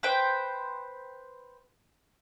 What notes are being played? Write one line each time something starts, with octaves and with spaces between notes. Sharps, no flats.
B4 C5 G5